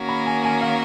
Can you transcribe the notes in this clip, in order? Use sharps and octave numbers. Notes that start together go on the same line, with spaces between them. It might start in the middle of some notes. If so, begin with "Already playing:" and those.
Already playing: D#3 A#3 C#4 F#4 A#4
B5
G#5
G#5
F5